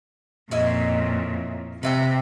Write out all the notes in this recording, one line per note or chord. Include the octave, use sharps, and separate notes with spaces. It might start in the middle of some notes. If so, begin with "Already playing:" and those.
F2 A#2 C#4 E4 D#5
C3 B4 E5 G5